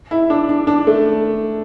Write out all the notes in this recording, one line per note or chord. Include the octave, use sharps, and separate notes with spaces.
E4
D4
D4
D4
A3